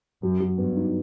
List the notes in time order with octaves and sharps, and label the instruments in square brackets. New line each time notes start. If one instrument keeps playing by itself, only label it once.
[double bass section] F#2 [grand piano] F#3
[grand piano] F#3
[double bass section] G2 [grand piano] B3
[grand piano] D#4